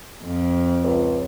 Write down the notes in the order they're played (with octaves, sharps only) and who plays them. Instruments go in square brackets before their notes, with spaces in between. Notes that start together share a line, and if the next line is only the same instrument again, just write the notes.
[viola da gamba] F2
[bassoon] C#2